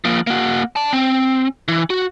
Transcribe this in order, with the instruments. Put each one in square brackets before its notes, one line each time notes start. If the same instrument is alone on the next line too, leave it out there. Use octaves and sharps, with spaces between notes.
[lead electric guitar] F3 A#3
A#3 F#4
D5 A5
C4
E3
F#4